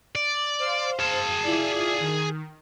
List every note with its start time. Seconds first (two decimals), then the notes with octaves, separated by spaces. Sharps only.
0.15 D5
0.59 C5 F5
0.99 G#4 A5
1.43 E4 F4 D5
2.00 D#3